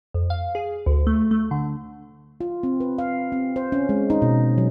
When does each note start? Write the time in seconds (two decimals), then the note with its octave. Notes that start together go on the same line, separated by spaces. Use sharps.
0.14 F2
0.30 F5
0.55 G#4
0.86 D2
1.07 A3
1.31 A3
1.51 D3
2.41 F4
2.63 C4
2.80 B4
2.98 F5
3.32 C4
3.56 C5
3.72 C#4
3.89 G#3
4.10 D#4
4.22 B2
4.58 F#3